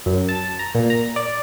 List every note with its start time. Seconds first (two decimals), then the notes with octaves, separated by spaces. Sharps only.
0.06 F#2
0.29 A5
0.59 A#5
0.75 A#2
0.90 A#5
1.16 D5